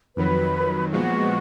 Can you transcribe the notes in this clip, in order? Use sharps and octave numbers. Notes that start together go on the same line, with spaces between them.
F2 D#3 F#3 B4
A#2 F3 G#3 B3 F#4